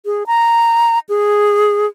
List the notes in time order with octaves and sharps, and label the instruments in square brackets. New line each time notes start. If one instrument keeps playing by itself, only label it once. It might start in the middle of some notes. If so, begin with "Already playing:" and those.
[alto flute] G#4
A#5
G#4